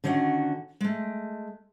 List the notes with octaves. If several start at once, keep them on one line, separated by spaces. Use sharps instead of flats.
D3 D#3 C#4 F#4 F5 F#5
G#3 A3